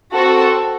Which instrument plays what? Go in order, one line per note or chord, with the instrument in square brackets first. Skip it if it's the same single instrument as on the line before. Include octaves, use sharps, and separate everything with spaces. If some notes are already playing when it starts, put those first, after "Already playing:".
[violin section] C4 F#4 A4